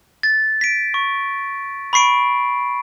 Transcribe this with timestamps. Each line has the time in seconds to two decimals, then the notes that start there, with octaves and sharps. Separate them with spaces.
0.23 A6
0.61 B6 D7
0.94 C#6
1.93 B5 C#6 C7 D7